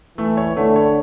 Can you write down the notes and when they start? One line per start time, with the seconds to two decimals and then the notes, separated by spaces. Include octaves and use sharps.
0.18 E3 A3
0.37 C#5
0.56 D3 A3
0.76 C#5